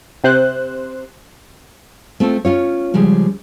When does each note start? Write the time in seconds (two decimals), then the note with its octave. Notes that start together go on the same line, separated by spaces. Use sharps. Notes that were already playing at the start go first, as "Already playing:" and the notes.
0.24 C3 C5 F#6
2.20 A3 C4 F4 A4
2.45 C#4 F4 C#5
2.94 C#3 F3 G3 G#3